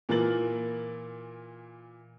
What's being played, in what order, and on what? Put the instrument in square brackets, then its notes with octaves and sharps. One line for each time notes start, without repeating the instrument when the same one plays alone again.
[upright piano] A#2 E3 A#3 A#4 A6 F#7